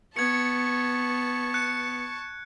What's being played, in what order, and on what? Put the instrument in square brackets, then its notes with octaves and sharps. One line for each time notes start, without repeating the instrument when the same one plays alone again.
[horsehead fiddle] B3 [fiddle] A5 C#6 [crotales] G#6 C#7
[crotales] F#6 C#7